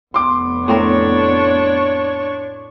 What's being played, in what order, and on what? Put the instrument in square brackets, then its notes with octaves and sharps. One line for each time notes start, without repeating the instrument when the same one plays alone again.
[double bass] F1 B3 [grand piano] C6 D6
[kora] A2 C4 A#4 [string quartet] D4 C#5 C#6